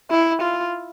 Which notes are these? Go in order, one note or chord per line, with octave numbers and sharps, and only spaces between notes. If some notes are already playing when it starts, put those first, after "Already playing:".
E4
F4